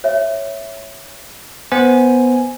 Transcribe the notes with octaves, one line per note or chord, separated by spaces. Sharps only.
C#5 E5
B3 C5 G#5